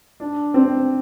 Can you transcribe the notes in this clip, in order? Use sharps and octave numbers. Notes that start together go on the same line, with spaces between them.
D4
C4